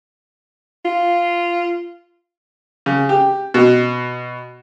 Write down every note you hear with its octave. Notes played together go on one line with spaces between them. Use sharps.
F4
C#3
G4
B2